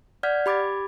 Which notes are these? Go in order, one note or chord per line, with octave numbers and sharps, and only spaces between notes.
D5 F#5 F6 G6 G#6 B6
G4 B5 D6 G#6 A6